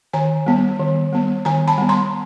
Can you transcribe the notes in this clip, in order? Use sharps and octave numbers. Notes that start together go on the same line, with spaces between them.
D#3 G#5 A#5
G3 B3
D#3
G3 B3
D#3 G#5 A#5
A5 B5
G3 B3
A#5 C6